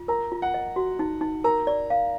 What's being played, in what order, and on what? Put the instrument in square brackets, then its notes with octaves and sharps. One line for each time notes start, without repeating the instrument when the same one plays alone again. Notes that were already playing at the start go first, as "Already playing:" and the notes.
Already playing: [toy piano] F4
[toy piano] A#4 [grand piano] A#5
[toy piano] F4
[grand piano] F#5
[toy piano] D#5
F#4
D#4
D#4
[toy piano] A#4 [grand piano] A#5
[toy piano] D5
F5